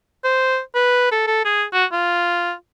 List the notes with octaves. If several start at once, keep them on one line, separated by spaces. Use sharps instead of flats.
C5
B4
A4
A4
G#4
F#4
F4